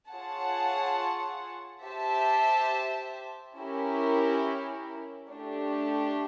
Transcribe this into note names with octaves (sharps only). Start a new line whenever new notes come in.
F4 G#4 C#5 F#5 A5
G4 C5 E5 A5
C#4 E4 G4 A#4
A3 D4 G4